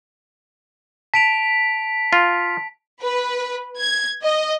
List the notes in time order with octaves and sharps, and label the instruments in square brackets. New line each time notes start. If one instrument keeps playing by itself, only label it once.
[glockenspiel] A5 D7 F7 [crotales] B6
[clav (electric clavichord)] F4
[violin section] B4
G#6
D#5